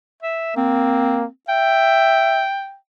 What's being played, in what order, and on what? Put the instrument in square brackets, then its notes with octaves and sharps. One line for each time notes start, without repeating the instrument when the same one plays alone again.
[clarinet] E5
[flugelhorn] A#3 [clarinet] C4
[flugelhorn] E5 [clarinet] G5